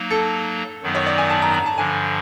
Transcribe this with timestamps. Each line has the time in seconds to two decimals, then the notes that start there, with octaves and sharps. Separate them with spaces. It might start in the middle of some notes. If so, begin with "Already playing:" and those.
Already playing: F#3 A#3 D#4
0.10 A4
0.82 F#2 D#3 F#3 B3 D#4
0.95 C#5
1.06 D5
1.18 G#5
1.30 A5
1.42 A#5
1.54 A#5
1.66 A5
1.77 G2 D3 F3 G#5